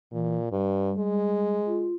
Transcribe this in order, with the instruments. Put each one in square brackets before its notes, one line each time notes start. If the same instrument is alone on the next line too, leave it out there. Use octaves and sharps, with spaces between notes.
[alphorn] A#2 [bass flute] E3
[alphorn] G2 [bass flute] G3
[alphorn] G#3
[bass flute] F4